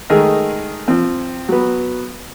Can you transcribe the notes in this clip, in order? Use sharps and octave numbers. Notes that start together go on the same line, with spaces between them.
D#3 G#3 A3 G#4 A#4
F3 C4
F#3 B3